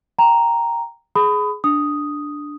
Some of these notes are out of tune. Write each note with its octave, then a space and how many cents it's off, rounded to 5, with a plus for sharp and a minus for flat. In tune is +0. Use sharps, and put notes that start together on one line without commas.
G5 +0 A#5 +0
G#4 +15 B5 +25 D#6 +0
D4 +0 D#6 +0